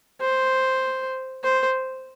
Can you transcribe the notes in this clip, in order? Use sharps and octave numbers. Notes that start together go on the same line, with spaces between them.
C5
C5